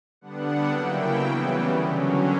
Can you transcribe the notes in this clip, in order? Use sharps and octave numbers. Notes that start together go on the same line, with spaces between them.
D3 G3 B3 D4 F#5
C#3 F#3 A#3 E4 G5
C#3 E3 G3 B3
D3 F#3 C#4